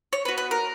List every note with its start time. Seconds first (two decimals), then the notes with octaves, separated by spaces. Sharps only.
0.13 C#5
0.25 B3 F#4 B4
0.38 B4
0.51 A#4